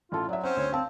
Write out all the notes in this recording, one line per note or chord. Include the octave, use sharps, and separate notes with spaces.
A1 F4 A4
F#3 D5 E5
C4 C#4 C5 F#5
D2 C#5
C4 F5 A5